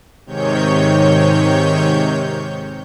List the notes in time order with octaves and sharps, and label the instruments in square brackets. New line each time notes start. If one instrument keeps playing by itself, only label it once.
[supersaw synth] G#2 C3 D#3 C#5 G6